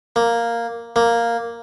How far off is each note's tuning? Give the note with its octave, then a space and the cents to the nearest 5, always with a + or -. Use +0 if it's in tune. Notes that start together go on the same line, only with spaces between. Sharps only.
A#3 +0
A#3 +0